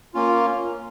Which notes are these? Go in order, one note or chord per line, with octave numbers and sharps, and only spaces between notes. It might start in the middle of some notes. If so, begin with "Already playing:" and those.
A#3 C#4 F4